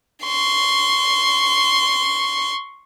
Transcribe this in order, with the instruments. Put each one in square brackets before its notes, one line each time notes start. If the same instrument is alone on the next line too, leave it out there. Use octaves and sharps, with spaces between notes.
[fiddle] C6 C#6